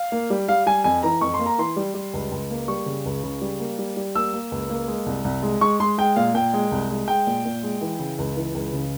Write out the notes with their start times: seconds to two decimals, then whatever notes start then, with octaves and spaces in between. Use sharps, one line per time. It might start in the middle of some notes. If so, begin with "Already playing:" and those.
Already playing: F5
0.12 A#3
0.30 G3
0.48 G3 F5
0.66 G3 G#5
0.84 F2 G#5
1.03 E3 A#5
1.21 F2 C#6
1.34 C6
1.39 A#3
1.46 A#5
1.58 E3 C6
1.76 G3
1.94 G3
2.14 C#2
2.32 C#2
2.51 A#3
2.68 G3 C#6
2.86 C#3
3.06 C#2
3.24 C#3
3.41 G3
3.60 A#3
3.79 G3
3.97 G3
4.15 A#3 E6
4.33 A#3
4.52 C#2
4.70 A#3
4.88 G#3
5.06 C2
5.25 C2
5.43 G#3
5.61 G#3 C#6
5.80 G#3 C6
5.98 G#3 G5
6.16 A#2 F5
6.34 A#2 G5
6.54 G#3
6.72 C2
6.89 G#3
7.08 G#3 G5
7.27 A#2
7.46 A#2
7.63 G#3
7.81 E3
7.99 C#3
8.18 C#2
8.36 E3
8.55 C#2
8.73 C#3